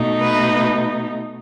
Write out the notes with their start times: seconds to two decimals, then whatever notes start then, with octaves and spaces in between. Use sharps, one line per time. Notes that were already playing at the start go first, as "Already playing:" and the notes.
Already playing: B2 A3 D#4
0.22 B4